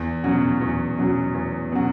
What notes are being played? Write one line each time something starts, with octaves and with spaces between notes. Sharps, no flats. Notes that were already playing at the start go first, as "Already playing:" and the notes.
Already playing: E2
B2 F#3 C#4 F#4
E2
B2 F#3 C#4 F#4
E2
B2 F#3 C#4 F#4